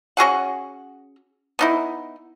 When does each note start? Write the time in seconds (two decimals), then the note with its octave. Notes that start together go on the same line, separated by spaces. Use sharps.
0.17 C#4 F#4 G#4 F#5
1.59 B3 D#4 E4